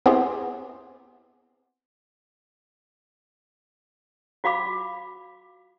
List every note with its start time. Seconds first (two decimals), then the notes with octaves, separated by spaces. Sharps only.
0.06 B3 C4 E4 G4 G#4 C5
4.44 F4 F#4 F5 B5 D6